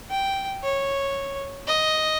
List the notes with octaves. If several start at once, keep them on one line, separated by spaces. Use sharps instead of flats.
G5
C#5
D#5